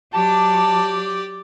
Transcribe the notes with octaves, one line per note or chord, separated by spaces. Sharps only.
F#3 G4 D5 A5